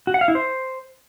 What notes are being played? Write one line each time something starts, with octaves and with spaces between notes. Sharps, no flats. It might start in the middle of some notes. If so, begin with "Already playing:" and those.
F#4
F#5
F5
E4
C5